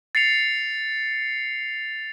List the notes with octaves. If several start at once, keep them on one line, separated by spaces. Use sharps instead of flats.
A6 C7 C#7 F7